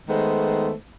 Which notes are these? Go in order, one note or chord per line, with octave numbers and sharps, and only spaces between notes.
D#3 G#3 A3 B3 C5